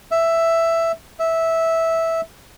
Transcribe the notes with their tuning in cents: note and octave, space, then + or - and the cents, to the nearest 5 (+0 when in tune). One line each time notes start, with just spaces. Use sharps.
E5 +5
E5 -10